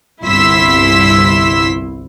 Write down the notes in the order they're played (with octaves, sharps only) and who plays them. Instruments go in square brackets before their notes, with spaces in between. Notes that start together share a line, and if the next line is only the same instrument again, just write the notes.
[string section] G1 C2 E4 C6 E6 B6